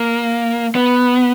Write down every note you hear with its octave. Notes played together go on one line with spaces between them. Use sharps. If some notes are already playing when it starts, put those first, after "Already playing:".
Already playing: A#3
B3